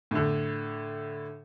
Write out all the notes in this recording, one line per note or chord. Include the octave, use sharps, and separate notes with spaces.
A2 D3